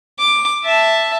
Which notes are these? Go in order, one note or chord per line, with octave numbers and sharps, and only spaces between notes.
D6
E5 A5